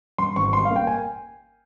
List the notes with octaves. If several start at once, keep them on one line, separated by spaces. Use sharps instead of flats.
G2 C6
G#1 C#6
G3 C6
F5
A#3
G5
G#5